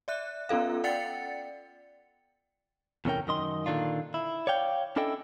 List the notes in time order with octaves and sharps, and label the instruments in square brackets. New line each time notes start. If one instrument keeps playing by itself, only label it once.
[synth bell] D5 E5 F#6
B3 C#4 F4 A4 F5
D5 F#5 G5 A6 C#7
[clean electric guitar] E2 A2 C3 C#4 A#4 G5
F#2 D#3 D#5 C6
A#2 D3 D#3 D4 F4
E4
C#5 D5 F5 G5
C#4 D4 E4 A4 D#5 G5